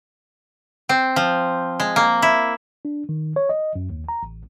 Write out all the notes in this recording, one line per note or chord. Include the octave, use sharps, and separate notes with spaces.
C4
F3
G#3
A#3
E4
D4
D#3
C#5
D#5
F#2
D#2
A#5
A1